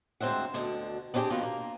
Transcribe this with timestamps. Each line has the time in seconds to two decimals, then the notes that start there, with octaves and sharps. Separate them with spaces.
0.21 D2 G#2 C4 C5 E5 F#5
0.54 D2 B2 D3
1.14 B3 C4 D4 E4 G4 G#4
1.30 B2 D#3 A#3 F4 B4
1.43 A#3